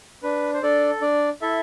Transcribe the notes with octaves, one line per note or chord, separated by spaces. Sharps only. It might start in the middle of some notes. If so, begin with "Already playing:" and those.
D4 B4
C5
D4 A4 D5
D4 D5
E4 A4 E5